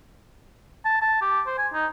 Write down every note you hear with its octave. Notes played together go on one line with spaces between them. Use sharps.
A5
A5
G4
C5
G#5
D#4